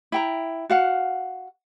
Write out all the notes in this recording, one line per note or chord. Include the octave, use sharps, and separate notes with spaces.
E4 G5 A#5
F#4 F5 F#5